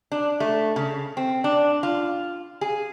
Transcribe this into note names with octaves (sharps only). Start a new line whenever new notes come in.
D4
A3
C#3
C4
D4
F4
G#4